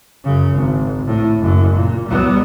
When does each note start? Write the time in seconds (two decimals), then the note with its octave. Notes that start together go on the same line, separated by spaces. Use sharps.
0.24 F#2 C#3
0.54 G#1
1.07 A2
1.40 F#1 F#2
1.75 A#2
2.08 G3 B3